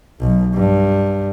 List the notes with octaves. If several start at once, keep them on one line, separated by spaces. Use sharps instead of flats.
B1
G2